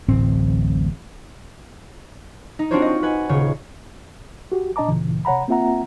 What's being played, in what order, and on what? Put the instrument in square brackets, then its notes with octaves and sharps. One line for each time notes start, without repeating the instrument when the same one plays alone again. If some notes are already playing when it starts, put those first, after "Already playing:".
[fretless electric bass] D1 A1 C4
[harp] D#4
C4 D4 F4 F#4 C5 C#5
D#5 C#6
B4 F#5 G#5
D#1 C#3 F4 C#5
[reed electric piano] F#4 G4
A#2 D4 D#5 A5 A#5 D6
D2 A#2 C#3 E3
C3 C#5 F#5 A#5 B5
A#3 C4 F4 E5 F#5 A#5